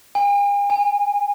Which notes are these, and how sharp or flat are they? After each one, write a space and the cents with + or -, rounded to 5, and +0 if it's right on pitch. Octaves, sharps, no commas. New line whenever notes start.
G#5 -45
G#5 -15